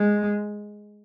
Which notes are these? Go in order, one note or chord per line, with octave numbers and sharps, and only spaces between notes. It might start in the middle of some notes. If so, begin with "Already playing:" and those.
Already playing: G#3